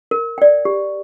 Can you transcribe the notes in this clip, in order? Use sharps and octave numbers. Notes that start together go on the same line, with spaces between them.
A#4
D5 G5
G4